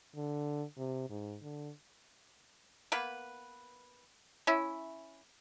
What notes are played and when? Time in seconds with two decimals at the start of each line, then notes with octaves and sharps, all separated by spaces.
0.16 D3
0.78 C3
1.10 G#2
1.43 D3
2.92 A#3 B3 B4
4.47 C#4 E4